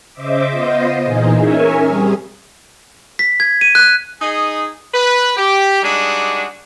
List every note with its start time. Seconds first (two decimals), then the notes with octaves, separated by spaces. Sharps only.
0.13 C#3 C5 D#5 E5 D6
0.50 B3 F4 C5 D#5
1.01 A#2 E3 D#4 G#4
1.37 C#4 A#4 C#5 E5 G#5
1.84 G3 C4 C#4 G#4
3.19 B6
3.40 G#6
3.61 D#7
3.75 F#6
4.22 D#4 G#4
4.94 B4
5.37 G4
5.82 G3 G#3 D4 D#4 F#4